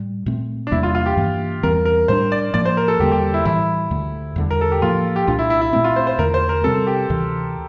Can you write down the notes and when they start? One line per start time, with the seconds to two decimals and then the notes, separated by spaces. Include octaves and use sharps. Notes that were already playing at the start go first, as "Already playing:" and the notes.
Already playing: A2 G3
0.26 A#2 A3 C4
0.67 D4
0.72 E2 C3 G3 A#3 E4
0.83 F4
0.95 F4
1.06 G4
1.17 G2 E3 A#3
1.63 E2 E3 G3 C4 A#4
1.85 A#4
2.08 A2 G3 D4 C5
2.32 D5
2.54 A2 F3 A#3 D5
2.65 C5
2.77 A#4
2.88 A4
3.00 E2 D3 G3 A#3 G4
3.11 G4
3.34 E4
3.45 A2 E3 G3 E4
3.91 D2 D3 A3
4.36 E2 D3 G3
4.51 A#4
4.61 A4
4.72 G4
4.82 A2 F3 A#3 F4
5.16 G4
5.27 C2 A#2 A3 D4 F4
5.39 E4
5.50 E4
5.61 E4
5.73 A#2 A3 C4 E4
5.84 F4
5.96 C5
6.07 C5
6.18 E2 D3 A3 A#4
6.34 C5
6.49 A#4
6.64 C3 G3 C4 A4
6.87 G4
7.10 D2 C3 E3